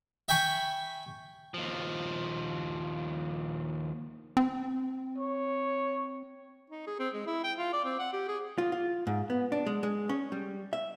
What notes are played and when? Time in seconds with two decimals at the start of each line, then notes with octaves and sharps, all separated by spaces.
0.28 E5 G5 G#5 B5 C#6
1.54 D#2 F3
4.37 C4
5.18 C#5
6.70 D#4
6.87 G#4
6.99 C4
7.14 G#3
7.26 E4
7.43 G5
7.58 F4
7.73 D5
7.85 C4
7.99 F#5
8.13 G4
8.28 G#4
8.58 F4
8.72 F4
9.07 G#2
9.30 B3
9.52 D4
9.66 G#3
9.83 G#3
10.09 C#4
10.32 G3
10.73 E5